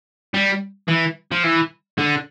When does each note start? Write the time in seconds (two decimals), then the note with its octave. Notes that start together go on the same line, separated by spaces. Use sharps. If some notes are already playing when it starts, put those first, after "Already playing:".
0.34 G3
0.88 E3
1.32 F3
1.43 E3
1.98 D3